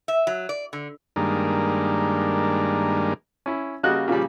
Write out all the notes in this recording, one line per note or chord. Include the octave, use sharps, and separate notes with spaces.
E5
F#3
D5
D3
G2 D#3 G#3 A#3 D4
C#4 E4
C#3 G3 A#3 F#4 D#5 F#6
A#2 C#3 F3 G3